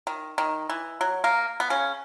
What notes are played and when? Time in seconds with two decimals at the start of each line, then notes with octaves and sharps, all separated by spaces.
0.07 D#3
0.38 D#3
0.69 E3
1.01 F#3
1.24 A#3
1.60 B3
1.70 C#3 C#4